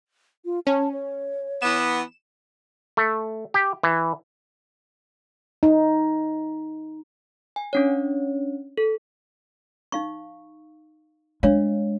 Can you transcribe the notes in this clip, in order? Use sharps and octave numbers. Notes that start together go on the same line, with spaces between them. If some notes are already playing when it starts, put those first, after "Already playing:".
F4
C#4 A5
C#5
E3 B3 E7
A3
G4
E3
D#4
G#5
C#4 D4 C#5
A4
D#4 F5 C#6
G#3 D4 C#5 F5